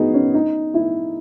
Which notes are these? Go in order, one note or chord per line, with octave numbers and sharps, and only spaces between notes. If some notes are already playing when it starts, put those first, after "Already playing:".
Already playing: B3 D#4 F#4 G#4
C#4
D#4
E4